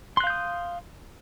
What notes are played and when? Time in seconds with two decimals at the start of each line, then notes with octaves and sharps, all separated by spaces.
0.17 C6
0.20 F#6
0.24 F5
0.27 G6
0.30 D#6